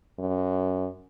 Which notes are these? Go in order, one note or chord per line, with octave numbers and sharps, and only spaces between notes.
F#2